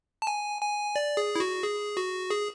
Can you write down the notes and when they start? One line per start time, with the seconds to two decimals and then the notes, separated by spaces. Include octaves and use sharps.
0.22 A5
0.27 G#5
0.61 G#5
0.96 D5
1.17 G#4
1.36 E4
1.40 F#4
1.63 G#4
1.97 F#4
2.30 G#4